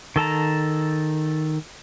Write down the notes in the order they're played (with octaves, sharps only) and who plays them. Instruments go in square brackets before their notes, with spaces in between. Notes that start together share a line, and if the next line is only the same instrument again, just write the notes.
[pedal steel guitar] D#3 A4 A5 A#5